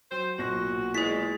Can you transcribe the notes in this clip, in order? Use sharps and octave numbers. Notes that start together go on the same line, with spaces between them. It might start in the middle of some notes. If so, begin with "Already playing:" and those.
F#3 C5
B1 A#2 F#4 A#6
E2 G#3 E4 G#4 A6 B6